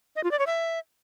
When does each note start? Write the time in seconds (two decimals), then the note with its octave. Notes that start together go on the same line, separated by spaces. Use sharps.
0.16 D#5
0.24 F4
0.31 D5
0.39 C#5
0.47 E5